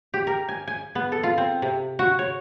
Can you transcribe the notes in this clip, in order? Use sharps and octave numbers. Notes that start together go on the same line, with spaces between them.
G4
A#4
G#5
G#5
B3
A4
F4
C4
C3
F#4
C#5